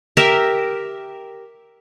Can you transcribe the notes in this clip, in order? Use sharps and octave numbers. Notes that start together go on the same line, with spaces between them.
G4 A#4 E5